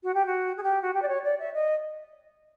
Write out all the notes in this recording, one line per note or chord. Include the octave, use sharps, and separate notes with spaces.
F#4
G4
F#4
G#4
G4
F#4
G4
D5
C#5
D5
E5
D#5